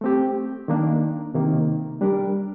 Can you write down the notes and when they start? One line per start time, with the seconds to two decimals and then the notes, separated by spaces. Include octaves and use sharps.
0.01 A3 C4 G4
0.68 D#3 A#3 D4
1.34 C3 D#3 A#3
2.01 G3 D4 G4 A#4